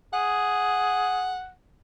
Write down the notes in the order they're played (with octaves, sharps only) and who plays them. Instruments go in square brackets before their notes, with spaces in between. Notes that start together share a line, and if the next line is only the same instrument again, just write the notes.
[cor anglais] G#4 [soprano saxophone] F#5